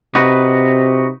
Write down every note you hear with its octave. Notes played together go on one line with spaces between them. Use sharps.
C3 D#4 F#4 B4